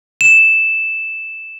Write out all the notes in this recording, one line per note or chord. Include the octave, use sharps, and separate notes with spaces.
E7